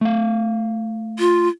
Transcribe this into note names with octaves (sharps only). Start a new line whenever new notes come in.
A3 F5
F4